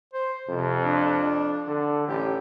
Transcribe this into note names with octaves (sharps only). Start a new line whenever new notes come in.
C5
F2 C3
D4
D3
A1 G4